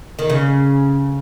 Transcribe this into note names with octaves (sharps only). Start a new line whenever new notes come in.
D#3
C#3